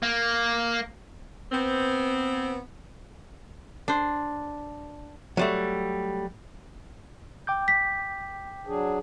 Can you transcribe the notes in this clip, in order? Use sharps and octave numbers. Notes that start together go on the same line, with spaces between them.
A#3
B3 C4
D4 C5
F#3 G3 A3
G5 D6 G6
B6
F#3 D4 G#4